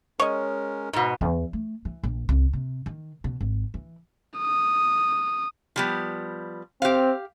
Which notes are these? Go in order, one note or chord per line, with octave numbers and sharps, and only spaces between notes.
G#3 C#4 A#4 C#5 D#5
G#2 B2
E2
A3
E3
A#1
C2
C3
D#3
B2
G#1
E3
D#6
F3 G3 B3
C4 G4 F5